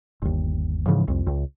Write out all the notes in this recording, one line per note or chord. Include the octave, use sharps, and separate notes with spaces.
G1 D#2
G#2 C#3 E3 F3
C2 F2
C#2